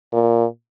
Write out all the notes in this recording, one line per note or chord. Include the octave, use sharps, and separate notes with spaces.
A#2